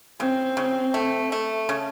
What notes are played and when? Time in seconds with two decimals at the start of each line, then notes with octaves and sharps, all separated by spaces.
0.20 C#3 C4
0.57 C#3
0.94 A3
1.32 A3
1.69 C#3